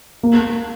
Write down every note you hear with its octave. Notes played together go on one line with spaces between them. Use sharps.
A#3